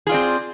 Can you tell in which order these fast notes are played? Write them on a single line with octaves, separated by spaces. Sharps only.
G#4 F4 D5 C4